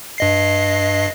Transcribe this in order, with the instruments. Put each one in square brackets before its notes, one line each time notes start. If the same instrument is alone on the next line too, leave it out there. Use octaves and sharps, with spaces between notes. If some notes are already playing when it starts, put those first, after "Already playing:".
[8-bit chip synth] G2 D#5 C7